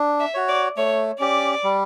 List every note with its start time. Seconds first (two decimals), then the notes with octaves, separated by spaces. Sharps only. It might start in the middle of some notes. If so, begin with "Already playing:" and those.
Already playing: D4
0.20 E5
0.34 F#4 C#5
0.48 D5
0.77 A3 C#5
1.20 C#4 G4 D5
1.64 G3